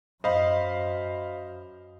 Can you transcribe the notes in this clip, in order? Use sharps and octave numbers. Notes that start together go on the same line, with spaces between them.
F#2 C5 D#5 F5 B5